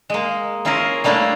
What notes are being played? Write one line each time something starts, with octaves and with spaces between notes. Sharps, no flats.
G#3 A#3
C#4 E4 F4 G#4 A#4
G3 A3 A#3 D4 E4